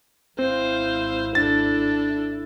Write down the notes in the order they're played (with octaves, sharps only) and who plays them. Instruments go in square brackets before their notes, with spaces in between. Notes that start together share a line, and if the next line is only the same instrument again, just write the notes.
[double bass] G#1 E4 [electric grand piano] C4 [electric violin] C5 F5
[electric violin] D4 A4 [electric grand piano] A6